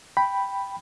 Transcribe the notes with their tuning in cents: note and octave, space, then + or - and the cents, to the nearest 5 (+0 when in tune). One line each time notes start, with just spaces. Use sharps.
G5 +0 B5 +0